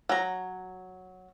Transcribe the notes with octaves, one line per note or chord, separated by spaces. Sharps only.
F#3 A#5